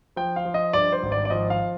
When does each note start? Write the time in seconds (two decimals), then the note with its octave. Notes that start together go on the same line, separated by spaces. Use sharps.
0.16 F3 G5
0.36 F5
0.45 F3
0.54 D#5
0.73 G2 D5
0.92 C5
1.03 G#1
1.12 D5
1.25 D5
1.30 F3 D#5
1.50 F5